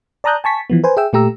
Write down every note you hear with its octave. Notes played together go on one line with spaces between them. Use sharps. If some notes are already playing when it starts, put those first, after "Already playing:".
D5 A5 A#5 D#6 F#6 G6
G#5 A5 C#6 B6
E3 F3 B3
B4 C5 G#5
G#4 E5 G5 E6
A#2 A3 G4 A#5 E6